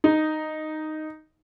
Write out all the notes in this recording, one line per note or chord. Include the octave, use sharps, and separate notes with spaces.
D#4